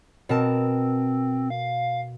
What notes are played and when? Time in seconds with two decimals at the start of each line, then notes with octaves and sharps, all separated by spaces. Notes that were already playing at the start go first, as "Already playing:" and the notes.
0.29 B2 C4 A#4 A5
1.50 F5